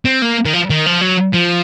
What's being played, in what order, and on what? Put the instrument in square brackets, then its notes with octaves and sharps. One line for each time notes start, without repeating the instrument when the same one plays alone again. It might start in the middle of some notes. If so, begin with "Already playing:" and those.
[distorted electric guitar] C4
A#3
D#3
F3
D#3
F3
F#3
F3